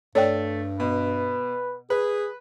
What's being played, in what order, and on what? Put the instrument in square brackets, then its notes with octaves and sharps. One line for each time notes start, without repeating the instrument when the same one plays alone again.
[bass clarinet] G2 [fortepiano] A3 [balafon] C#5 D5 G5
[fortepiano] B2 [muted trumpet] B4
[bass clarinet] G#4 [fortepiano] B4